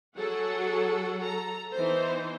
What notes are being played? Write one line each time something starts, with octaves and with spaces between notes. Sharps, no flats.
F#3 G#4 A4 F#5
A4 A#5
E3 B3 D#4 C5